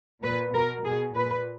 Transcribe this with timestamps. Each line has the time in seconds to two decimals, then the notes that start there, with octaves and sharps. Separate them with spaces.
0.22 A#2 B4
0.53 B2 A#4
0.84 B2 G#4
1.14 A#2 B4